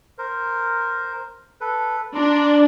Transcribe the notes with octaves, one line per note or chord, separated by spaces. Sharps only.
A#4 C5
A4 B4
D4 A#5 C6 D6